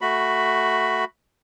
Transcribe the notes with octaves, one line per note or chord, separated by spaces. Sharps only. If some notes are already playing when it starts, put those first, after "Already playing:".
A3 F#4 B5